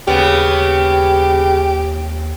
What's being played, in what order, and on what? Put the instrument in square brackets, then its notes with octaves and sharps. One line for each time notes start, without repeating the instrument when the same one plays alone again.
[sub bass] D#2 [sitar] C#3 B3 [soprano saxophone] G4